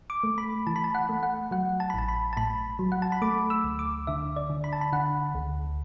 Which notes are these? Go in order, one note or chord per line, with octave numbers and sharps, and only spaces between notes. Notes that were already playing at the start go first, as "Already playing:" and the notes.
D6
A3
B5
E3 A5
B5
A5
F#5
A3
F#5
F#3 F#5
A5
B5
A1 A5
B5
A5
A2 B5
F#3
F#5
A5
B5
A3 D6
E6
D2
D6
D3 E5
D5
D3
B5
A5
B5
D3 F#5
D2